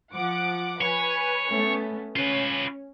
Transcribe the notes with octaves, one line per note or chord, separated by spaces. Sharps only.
F3 F#5 D6
B4 C#5 G#5
A3 B3 C#4
C#4 F4 B4